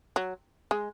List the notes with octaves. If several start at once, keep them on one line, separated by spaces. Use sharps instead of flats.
F#3
G#3